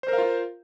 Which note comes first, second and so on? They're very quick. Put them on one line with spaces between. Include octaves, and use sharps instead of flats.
C5 A#4 F5 F4